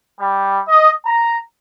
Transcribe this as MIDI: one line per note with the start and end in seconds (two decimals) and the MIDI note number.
0.19 0.60 55
0.68 0.91 75
1.05 1.37 82